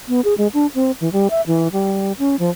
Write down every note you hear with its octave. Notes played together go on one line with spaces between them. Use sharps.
B3
G#4
G#3
D4
C4
E3
G3
E5
E3
G3
C#4
F3